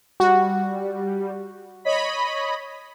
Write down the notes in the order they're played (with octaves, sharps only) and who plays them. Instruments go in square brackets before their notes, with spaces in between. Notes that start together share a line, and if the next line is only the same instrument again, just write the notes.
[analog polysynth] G3 [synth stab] F#4
[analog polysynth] C#5 D#5 B5